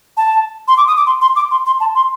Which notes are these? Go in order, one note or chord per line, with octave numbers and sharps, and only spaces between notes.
A5
C6
D6
D#6
D6
C6
C6
D6
C6
C6
A5
C6